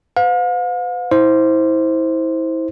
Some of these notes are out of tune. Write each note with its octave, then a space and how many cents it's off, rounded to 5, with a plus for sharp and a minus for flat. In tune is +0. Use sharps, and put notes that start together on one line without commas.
B4 +40 F5 +40
E4 -30 C5 +0